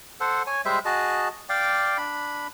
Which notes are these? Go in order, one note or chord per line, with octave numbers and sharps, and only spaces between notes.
A4 C5 F#5
C#5 G#5
G3 G#3 C5 E5
F#4 G#4 D#5 A5
D5 F5 G5 D6
D4 B5